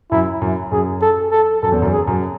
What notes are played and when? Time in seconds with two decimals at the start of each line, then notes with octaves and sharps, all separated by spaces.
0.11 F#2 E4
0.42 F#2
0.72 F#2 G#4
1.02 A4
1.32 A4
1.63 F#2 A4
1.72 E2
1.82 F#2
1.92 G#4
2.07 F#2